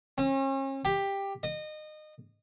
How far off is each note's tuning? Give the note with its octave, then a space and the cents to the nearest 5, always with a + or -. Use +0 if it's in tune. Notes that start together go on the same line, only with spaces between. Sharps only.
C#4 -40
G4 +10
D#5 -25